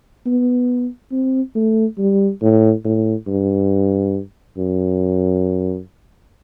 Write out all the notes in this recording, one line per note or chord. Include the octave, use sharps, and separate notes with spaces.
B3
C4
A3
G3
A2
A2
G2
F#2